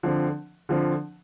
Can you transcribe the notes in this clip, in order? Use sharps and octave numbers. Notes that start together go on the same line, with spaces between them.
D3 F3 C4
D3 F3 C4